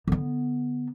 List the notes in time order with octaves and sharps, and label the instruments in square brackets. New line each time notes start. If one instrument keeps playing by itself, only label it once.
[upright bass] D3 B3